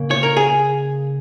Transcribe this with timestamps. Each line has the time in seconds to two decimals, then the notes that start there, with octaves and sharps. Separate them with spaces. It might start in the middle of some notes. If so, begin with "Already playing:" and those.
Already playing: C#3 A#3
0.11 C#5
0.23 A#4
0.37 G#4